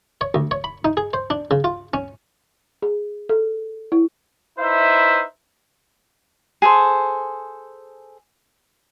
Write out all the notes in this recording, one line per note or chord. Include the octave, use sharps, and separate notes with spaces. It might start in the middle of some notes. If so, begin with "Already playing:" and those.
C#5
D2
C#5
B5
D#4
G#4
C5
D4
C#3
F4
C#4
G#4
A4
E4
D#4 E4 B4 C5 E5
G#4 A4 C5